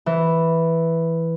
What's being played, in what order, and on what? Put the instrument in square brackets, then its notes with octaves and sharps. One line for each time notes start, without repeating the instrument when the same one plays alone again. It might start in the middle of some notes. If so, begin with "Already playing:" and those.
[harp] E3